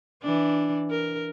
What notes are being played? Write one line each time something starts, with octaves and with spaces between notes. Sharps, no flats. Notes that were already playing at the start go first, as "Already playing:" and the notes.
E3 D4
A#4